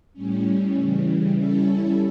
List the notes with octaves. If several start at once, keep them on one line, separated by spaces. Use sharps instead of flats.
A2 G3 C#4
C#3 E3 G3
G3 C#4 E4 A4